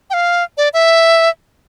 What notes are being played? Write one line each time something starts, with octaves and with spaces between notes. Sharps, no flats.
G5
F5
D5
E5